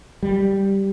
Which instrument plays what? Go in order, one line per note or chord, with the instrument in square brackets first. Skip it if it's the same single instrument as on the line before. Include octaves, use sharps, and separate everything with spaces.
[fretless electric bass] G3